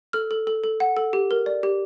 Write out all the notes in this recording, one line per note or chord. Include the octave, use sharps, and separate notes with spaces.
A4 F6
A4
A4
A4
F#5
A4
G4
A#4
D5
G4